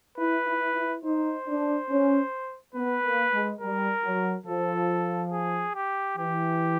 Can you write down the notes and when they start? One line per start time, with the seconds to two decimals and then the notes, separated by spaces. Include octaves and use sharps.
0.18 E4 B4
0.46 E4
0.75 E4
1.04 D#4 C5
1.46 D4
1.89 C#4
2.75 B3 B4
3.03 A#3
3.32 G#3
3.60 G3 A#4
4.04 F#3
4.46 F3 A4
5.32 G#4
5.75 G4
6.18 E3 G4